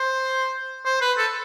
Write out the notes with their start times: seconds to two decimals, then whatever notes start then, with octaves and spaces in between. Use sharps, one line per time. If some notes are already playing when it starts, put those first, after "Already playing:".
Already playing: C5
0.85 C5
1.01 B4
1.18 A4